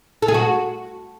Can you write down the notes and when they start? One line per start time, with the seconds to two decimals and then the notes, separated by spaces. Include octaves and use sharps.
0.22 A4
0.28 G#4
0.34 F#4